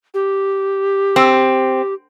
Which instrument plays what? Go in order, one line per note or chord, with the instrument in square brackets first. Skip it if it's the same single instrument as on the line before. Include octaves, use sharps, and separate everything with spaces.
[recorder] G4
[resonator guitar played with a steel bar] C4